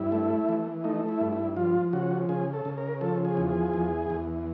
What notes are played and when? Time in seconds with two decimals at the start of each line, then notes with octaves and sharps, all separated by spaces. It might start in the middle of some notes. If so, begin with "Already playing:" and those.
Already playing: G2 E4
0.12 A3
0.49 E3
0.84 A3 D#4
1.08 E4
1.21 G2
1.32 E4
1.56 F3 F4
1.93 C#3 F#4
2.29 C#3 G#4
2.53 A4
2.65 C#3
2.78 A#4
3.01 F3 A4
3.25 G#4
3.37 E2
3.49 G#4
3.73 E2
4.10 E2